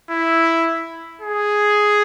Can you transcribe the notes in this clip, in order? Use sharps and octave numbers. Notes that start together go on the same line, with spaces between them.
E4
G#4